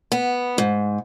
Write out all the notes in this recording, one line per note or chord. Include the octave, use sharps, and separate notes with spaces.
B3
G#2